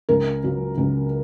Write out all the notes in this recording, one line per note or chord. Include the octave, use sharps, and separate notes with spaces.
C#2 A#4
C#3 F#3
C#2